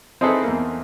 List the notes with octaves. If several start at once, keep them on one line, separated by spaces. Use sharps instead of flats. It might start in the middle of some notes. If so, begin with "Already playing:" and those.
C4 D#4 E4 G#4 A4 B4
E2 A#3